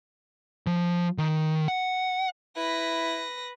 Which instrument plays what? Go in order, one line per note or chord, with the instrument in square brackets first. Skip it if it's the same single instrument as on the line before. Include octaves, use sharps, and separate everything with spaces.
[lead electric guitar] F3
D#3
F#5
[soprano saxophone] E4 [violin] B4 A#6